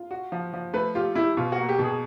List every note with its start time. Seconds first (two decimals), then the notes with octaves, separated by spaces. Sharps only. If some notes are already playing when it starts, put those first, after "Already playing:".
Already playing: F4
0.11 F#4
0.32 F3
0.54 F3
0.74 A3 B4
0.95 F4 G4
1.15 E4 G4
1.37 B2 F4
1.52 F#4
1.58 A#3
1.69 G4
1.79 B2
1.84 G#4